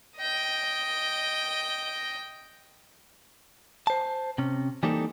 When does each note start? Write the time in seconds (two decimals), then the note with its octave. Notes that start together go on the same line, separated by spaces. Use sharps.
0.17 D#5 G5
3.87 C5 A5
4.38 C3 C#4
4.83 E3 G3 A#3 C4 D#4 A4